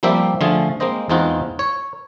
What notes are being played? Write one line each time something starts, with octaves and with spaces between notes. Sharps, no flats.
F3 G3 A#3 C4 G4 E5
D3 F3 A3 F4 G#4
G#3 A#3 C4 C5 D#5
E2 G#3 C4 D#4 F4 F#5
C#5